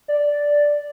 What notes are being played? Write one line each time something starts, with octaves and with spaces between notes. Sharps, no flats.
D5